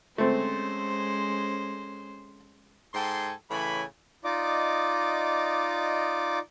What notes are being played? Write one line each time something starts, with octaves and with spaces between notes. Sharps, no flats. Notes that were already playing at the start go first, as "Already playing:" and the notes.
G#3 A3 C4 C#4 C5
G#2 A4 G5 G#5 C6
A2 C#3 E3 G#5 B5
D#4 F4 D5 D#5 D6